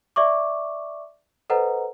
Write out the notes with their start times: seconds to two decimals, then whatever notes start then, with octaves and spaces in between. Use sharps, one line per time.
0.16 D5 E5 C#6 D6
1.50 A4 B4 C5 D#5 F#5 A#5